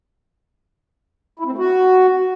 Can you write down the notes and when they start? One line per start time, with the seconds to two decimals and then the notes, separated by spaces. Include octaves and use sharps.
1.39 E4
1.46 C4
1.52 A3
1.58 F#4